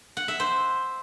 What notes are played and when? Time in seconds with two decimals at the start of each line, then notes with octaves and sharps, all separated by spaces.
0.17 F#5
0.28 E5
0.40 C5